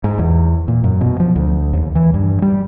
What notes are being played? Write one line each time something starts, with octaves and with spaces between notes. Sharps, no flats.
G#2
E2
A#2
F#2
B2
F3
D2
D#2
E3
G2
G3